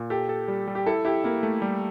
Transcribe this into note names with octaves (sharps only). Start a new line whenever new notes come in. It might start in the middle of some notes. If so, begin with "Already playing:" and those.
Already playing: A#2
G4 A4
A4
G3
G3
G4
E4 A4
E4 G4
A#3 E4
A3
G3